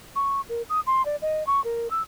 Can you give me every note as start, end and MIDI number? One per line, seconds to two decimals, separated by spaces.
0.16 0.41 85
0.49 0.62 70
0.70 0.80 87
0.87 1.04 84
1.05 1.16 74
1.22 1.46 75
1.47 1.63 85
1.64 1.90 70
1.91 2.02 88